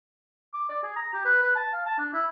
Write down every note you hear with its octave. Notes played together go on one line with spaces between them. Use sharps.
D6
D5
G#4
A#5
G4
B4
B4
A5
F5
A5
D4
E4